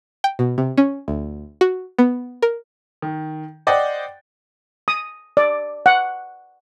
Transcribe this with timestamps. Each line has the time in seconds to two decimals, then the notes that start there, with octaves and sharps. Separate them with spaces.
0.24 G5
0.39 B2
0.58 C3
0.78 C#4
1.08 D2
1.61 F#4
1.99 B3
2.42 A#4
3.02 D#3
3.67 C5 D5 D#5 F#5 G5
4.88 D#6
5.37 D5
5.86 F#5